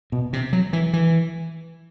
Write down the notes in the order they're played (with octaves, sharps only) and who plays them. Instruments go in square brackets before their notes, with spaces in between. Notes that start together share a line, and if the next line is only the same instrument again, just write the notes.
[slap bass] B2
C3
F#3
E3
E3